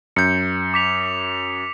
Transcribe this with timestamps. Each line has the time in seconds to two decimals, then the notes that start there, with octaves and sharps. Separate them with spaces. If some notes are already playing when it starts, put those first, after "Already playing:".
0.16 F#2 G6 C#7
0.74 D6 B6 F7